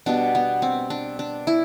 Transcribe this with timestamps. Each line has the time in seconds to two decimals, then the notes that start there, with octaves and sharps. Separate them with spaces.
0.06 B2 G3 B3 D4
0.35 B3
0.62 C4
0.90 D4
1.19 D4
1.47 E4